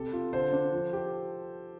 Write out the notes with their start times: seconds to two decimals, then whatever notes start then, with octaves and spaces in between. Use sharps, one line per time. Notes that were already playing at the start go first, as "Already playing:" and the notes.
Already playing: C3 G4 A4
0.13 F4
0.33 D3 C5
0.52 D4
0.72 F3
0.93 G4